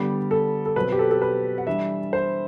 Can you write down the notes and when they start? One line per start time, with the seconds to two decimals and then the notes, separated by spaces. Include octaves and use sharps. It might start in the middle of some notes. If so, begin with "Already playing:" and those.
Already playing: D3 G3 B3 G4
0.31 A4
0.66 A4
0.76 B2 F#3 C4 B4
0.92 G4
0.99 A4
1.11 A4
1.22 B4
1.58 F#5
1.67 E3 G3 D4 E5
2.13 C5